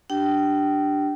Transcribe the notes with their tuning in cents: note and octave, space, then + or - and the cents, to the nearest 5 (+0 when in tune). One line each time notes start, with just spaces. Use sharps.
D4 +0 G4 -15 G5 -25